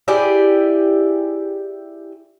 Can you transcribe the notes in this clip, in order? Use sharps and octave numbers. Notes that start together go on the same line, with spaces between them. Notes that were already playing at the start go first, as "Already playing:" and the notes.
E4 G4 G#4 D5